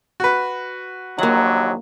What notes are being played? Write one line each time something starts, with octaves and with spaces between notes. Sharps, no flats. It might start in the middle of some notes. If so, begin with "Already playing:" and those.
F#4 B4
A#1 D#2 F#3 A#3 F#5